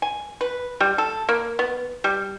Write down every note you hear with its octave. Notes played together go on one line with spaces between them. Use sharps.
G#5
B4
G3
A4
A#3
B3
G3